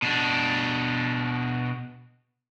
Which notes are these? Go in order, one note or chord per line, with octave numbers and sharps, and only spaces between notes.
B2 D4